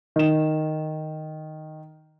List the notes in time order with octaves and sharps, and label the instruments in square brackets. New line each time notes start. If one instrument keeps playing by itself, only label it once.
[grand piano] D#3 E7